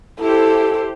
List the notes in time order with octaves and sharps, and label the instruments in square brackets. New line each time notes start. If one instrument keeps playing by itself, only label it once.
[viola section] E4 G4 C5 [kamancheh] A4